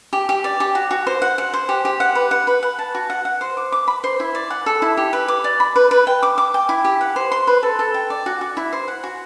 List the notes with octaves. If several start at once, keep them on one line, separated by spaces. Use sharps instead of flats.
G4
G4
D5
G4
F#4
F#4
C5
F#5
F#5
C5
G4
G4
F#5
B4
F#5
B4
F#5
A5
F#4
F#5
F#5
C5
D6
D6
B5
C5
E4
D5
F#5
A4
E4
G4
B4
D6
D5
B5
B4
B4
G5
D6
D6
G5
E4
G4
F#5
C5
C6
B4
A4
A4
G5
D5
F#4
F#4
E4
C5
F#5
F#4